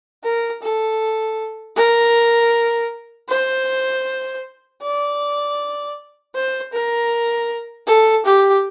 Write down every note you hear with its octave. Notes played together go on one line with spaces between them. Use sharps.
A#4
A4
A#4
C5
D5
C5
A#4
A4
G4